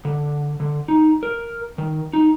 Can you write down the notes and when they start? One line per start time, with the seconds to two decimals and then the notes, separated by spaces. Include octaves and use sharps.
0.05 D3
0.60 D3
0.88 D#4
1.23 A#4
1.78 D#3
2.13 D#4